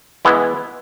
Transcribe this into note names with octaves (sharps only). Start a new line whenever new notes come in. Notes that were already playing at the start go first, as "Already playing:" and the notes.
E3 G#3 B3 E4